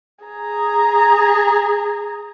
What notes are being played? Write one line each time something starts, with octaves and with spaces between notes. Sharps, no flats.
G#4 A#5